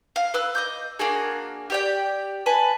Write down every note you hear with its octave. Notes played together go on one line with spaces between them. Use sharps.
F5
B4 E6 F#6
D#5 D6 G6
A#3 D4 F#4 G#4
G4 D5 G5
B4 G#5 A5